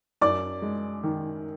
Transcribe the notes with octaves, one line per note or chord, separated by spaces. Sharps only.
F#2 D5 D6
G#3
D#3